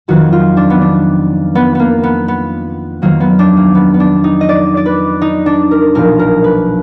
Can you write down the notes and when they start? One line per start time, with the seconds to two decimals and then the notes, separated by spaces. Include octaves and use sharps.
0.08 F2 D#3 F#3 F#4
0.32 F4
0.57 D4
0.70 B3
0.82 D4
1.55 B3
1.75 A#3 B3
2.03 B3
2.28 B3
3.02 F2 D#3 F#3 A#3
3.20 B3
3.39 D4
3.57 A#3
3.75 B3
3.94 B3
4.00 D4
4.24 D#4
4.41 D#5
4.49 D5
4.77 D5
4.86 B4
5.22 D#4
5.46 D4
5.71 A#4
5.95 B1 A#2 F3 A#4
6.19 A#4
6.44 B4